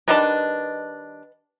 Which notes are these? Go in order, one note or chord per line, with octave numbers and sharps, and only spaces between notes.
D#3 G3 D4 B4 D#5 A5